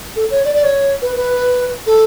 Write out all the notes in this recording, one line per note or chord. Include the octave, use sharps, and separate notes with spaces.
A4
C#5
D5
D5
C#5
B4
B4
A4